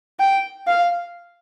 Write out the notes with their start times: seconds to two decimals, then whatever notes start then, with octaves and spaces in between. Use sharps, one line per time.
0.19 G5
0.67 F5